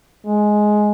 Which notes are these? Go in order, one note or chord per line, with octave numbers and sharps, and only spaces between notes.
G#3